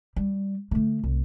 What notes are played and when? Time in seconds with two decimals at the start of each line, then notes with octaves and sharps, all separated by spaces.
0.16 G3
0.71 D3 A3
1.04 C2